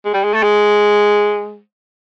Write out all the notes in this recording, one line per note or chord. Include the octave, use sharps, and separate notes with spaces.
G#3
G3
G#3
A3
G#3